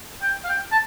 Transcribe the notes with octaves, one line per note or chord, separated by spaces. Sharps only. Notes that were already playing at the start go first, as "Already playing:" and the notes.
G5
F5
G5
A5